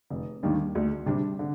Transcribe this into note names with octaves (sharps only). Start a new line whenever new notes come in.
F1
D#2 D#3 G3 D4
D2
C3 G3 D4
D3